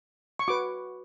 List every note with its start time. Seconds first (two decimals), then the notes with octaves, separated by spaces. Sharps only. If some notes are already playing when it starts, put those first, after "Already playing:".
0.39 C#6
0.48 F#4 B4 D6